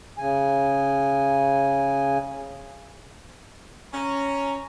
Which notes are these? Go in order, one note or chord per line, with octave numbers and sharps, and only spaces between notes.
C#3 G#5
C#4 A#5